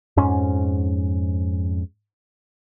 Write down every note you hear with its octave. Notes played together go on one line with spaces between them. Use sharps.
F2 G#2 C#4